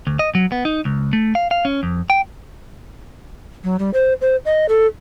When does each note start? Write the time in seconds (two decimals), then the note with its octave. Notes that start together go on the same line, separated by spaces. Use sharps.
0.07 D2
0.19 D#5
0.35 F#3
0.52 B3
0.65 D#4
0.85 C#2
1.13 A3
1.35 F5
1.51 F5
1.65 C#4
1.83 F2
2.10 G5
3.64 F#3
3.79 G3
3.93 C5
4.21 C5
4.45 D#5
4.69 A4